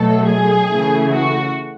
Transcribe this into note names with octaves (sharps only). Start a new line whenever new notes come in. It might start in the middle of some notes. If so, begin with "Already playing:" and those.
Already playing: B2 F#3 A3 A4
G#4
C#3 E3 A3
F#4